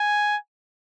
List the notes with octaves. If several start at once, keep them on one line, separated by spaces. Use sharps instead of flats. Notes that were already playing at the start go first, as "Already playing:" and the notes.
Already playing: G#5